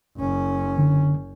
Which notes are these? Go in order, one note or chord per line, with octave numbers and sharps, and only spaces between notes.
F#1 C#4
D3